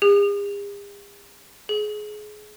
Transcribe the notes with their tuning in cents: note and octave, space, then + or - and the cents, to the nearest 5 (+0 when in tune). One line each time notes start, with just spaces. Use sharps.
G#4 -45
G#4 +25